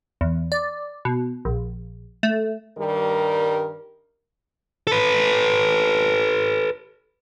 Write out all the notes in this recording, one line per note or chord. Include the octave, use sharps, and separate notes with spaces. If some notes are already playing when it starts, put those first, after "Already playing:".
E2
D5
B2
A#1
A3
G2 D#3 G3 A#4
A4 B4